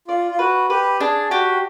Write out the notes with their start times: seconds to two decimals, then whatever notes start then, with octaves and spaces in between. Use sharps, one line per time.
0.08 F4 D5
0.31 F4
0.39 F#4 B4
0.70 G4 B4
1.00 D4 G#4
1.30 F#4 G4